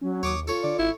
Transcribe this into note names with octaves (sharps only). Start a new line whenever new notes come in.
F#3 C#4
D#2 C#5 D6 D#6
F4 A4 C#5
D3 D5
G#1 E4